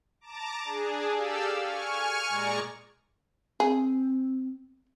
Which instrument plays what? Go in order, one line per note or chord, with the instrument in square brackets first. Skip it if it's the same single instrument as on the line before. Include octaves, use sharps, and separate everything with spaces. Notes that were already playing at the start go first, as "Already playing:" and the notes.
[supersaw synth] A5 A#5 D6
D4 G#4
G4 A4 D5 F5 E6
G#5 C#6 F6
A#2 G#3 D5 A#5 C#6
[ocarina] C4 [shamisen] G#4